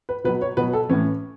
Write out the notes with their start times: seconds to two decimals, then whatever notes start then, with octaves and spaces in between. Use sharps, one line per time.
0.09 B4
0.24 B2 F#3 B4
0.42 C#5
0.57 B2 F#3 B4
0.73 A4
0.89 A2 E3 C#4